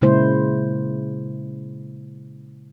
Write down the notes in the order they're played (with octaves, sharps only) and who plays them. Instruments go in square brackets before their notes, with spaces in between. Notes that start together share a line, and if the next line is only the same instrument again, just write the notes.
[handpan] A#2 C#3 G#3 A#3 E4 C5